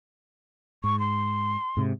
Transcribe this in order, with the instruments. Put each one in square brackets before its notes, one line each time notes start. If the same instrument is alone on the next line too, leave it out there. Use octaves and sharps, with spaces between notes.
[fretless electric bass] G#2 [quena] C#6
[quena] C6
[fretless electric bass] G#2 C3